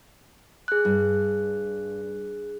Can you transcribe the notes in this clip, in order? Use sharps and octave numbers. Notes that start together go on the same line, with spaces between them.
G#4 F#6
G2